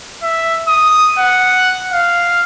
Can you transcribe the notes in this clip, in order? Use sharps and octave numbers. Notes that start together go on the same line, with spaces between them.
E5
D#6
F#5
F5